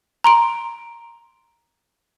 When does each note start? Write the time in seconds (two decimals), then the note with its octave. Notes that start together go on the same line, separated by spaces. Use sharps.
0.24 A#5 C6 D7